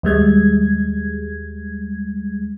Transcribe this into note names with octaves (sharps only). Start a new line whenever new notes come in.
D#2 G3 G#3 G#6